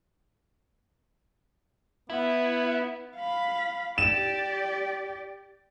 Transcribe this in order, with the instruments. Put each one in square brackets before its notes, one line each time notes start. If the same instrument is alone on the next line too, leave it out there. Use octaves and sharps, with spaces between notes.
[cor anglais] B3 [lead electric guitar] E4
[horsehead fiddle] F5 B5
[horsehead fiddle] G4 D5 [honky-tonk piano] E7